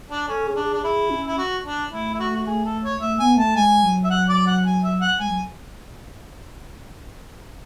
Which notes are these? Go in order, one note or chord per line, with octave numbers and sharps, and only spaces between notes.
D4
C#4 A4
C#4 G#4
D4
G#4
D4
E4 G#4
C#4
E4
F#4
D4
A3 E4
E4
F#4
F#4
G#4
A4
C#5
A3 E5
B3 G#5
A3 A5
G#3 G#5
F#3
E5
F#5
D5
F#5
G#5
E5
F#5
G#3 G#5
F#3